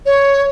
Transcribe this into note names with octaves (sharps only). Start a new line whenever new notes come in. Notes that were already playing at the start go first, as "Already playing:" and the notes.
C#5